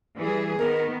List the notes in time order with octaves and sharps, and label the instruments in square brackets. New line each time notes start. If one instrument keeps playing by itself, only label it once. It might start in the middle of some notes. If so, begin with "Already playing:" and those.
[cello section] E3 G3 G#4
[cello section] D#3 B3 [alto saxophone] A#4